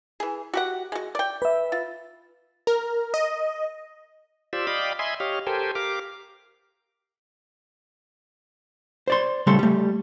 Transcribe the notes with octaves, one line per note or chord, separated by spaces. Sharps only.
E3 G#4
F#4 G4 F#5
G#3 F#4
D5 G5
B4 E5
F4
A#4
D#5
F4 G4 C5 D5 E6
D5 D#5 F5 G5 B5
D#5 E5 G#5 B5 C6
G4 C#5 D#5 F5
G4 A4 A#4 C5 G5 G#5
G4 A#4 F5 D6
C5 D5 C6
C#3 G3 A3 A4 C6
G3 A3